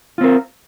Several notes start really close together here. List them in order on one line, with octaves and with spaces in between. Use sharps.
F4 C4 A#4